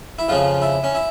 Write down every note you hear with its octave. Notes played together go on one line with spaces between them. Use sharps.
E4
F2 C#3 F3 F4
E4
C#4
E4